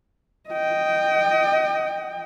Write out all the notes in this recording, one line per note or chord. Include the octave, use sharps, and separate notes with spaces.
D#5 G5